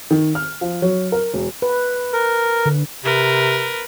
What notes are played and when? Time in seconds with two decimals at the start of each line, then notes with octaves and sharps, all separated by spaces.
0.11 D#3
0.35 F6
0.61 F3
0.82 F#3
1.12 A#4
1.33 E1
1.62 B4
2.13 A#4
2.66 D3
3.04 C3 A#4 B4